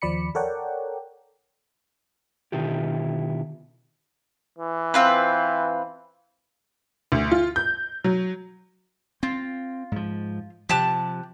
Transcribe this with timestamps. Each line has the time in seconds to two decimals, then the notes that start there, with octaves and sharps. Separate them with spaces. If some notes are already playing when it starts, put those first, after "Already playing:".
0.02 D#2 F3 D5 B5 C#7
0.35 A4 A#4 C#5 D5 F#5 G5
2.52 B2 D3 D#3 E4 F4 G4
4.59 E3
4.94 C4 F4 B4
7.12 D2
7.31 F4
7.56 G6
8.04 F#3
9.23 C4 F4
9.92 G#2 F3
10.69 C3 F3 G4 A5 F#6